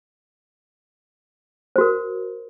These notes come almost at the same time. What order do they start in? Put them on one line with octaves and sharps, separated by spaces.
C5 F#4 A#4